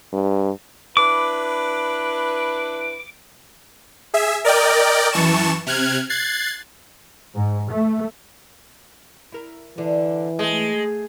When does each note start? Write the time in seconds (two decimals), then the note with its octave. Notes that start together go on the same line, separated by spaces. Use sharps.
0.13 G2
0.97 D4 E4 B4 D6
4.14 G#4 E5
4.45 A#4 D5 D#5 G5
5.12 F#2 E3 A5 C#6 E7
5.66 C3 F6 F#6 G#6
6.09 F#6 G#6 A6 C7
7.37 G#2
7.70 A3
9.32 E4 A#4
9.78 D3 E3 D4
10.39 G#3 A3